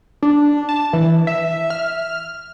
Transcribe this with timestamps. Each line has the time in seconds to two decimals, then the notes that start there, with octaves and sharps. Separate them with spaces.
0.23 D4
0.69 A5
0.93 E3
1.27 E5
1.70 F6